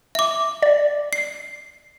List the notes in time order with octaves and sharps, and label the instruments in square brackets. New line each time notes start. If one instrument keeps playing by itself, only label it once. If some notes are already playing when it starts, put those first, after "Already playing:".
[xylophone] E5 D6
[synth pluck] D5
[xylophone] C7